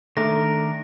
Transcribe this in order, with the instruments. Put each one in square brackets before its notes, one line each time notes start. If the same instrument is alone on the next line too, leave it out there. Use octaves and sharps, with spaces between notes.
[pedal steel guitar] D#3 D4 A#4 [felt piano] A3 [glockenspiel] A#6